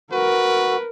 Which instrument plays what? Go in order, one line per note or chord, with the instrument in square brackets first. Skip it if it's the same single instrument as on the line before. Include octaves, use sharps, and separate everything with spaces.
[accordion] F#4 [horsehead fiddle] A#4 [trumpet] B4